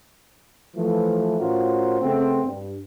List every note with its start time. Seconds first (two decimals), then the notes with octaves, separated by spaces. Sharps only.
0.76 E3 F3 A3
1.39 A2 C#4 F4 F#4 A#4 C5
2.01 C#3 A3 B3 C4
2.44 G2